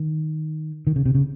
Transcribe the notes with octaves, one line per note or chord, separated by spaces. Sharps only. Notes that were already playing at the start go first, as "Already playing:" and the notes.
Already playing: D#3
D#3
C#3
C3
C#3